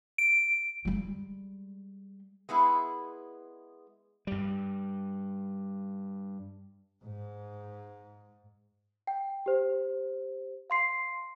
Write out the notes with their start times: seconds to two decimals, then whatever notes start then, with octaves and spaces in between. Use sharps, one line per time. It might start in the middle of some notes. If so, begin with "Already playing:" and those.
0.18 D7
0.85 G3 G#3
2.49 G#3 B3 E4 G#4
4.27 G2 G3
7.03 G#2
9.07 G5
9.46 G4 C5
10.70 F5 C6 C7